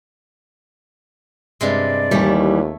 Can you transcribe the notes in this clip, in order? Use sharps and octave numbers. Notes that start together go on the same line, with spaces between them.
G2 C3 G#3 D5
D#2 E3 G3 A3 A4 C#5